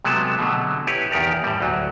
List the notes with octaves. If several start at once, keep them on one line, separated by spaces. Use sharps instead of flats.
C3 F#3 G#3 A3 B3 A5
B2 D3 F#3
E4 G4 B4 C#5
E2 D#3 G4 A#4 D5
A2 G3
D2 F#3